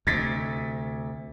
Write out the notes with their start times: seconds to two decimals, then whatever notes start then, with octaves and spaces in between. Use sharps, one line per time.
0.07 D2 C3 G#6 A6 B6